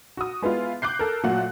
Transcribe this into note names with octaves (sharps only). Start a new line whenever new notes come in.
F#4 D#6
G#3 B3 E4 F4
D6 F#6 G6 C7
A4 A#4
A#2 F#3 A3 F#5 F#6